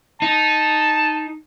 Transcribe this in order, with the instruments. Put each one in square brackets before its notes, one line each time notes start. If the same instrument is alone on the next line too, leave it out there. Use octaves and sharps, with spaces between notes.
[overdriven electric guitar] D#4 [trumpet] A5